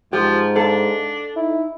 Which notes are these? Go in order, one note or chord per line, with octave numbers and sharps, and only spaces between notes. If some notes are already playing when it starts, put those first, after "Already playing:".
G#2 F3 G4
D4 A4 F5 A5
D#4 E4